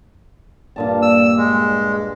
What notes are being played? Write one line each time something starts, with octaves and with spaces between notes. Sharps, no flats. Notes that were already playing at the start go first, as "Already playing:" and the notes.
G2 A#2 A5
E6
G#3